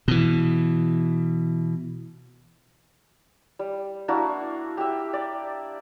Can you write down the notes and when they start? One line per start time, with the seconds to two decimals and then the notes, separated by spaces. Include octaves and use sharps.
0.08 B2 E3
3.59 G3
4.08 A#3 D4 E4 F#4
4.77 G4 E5
5.13 D5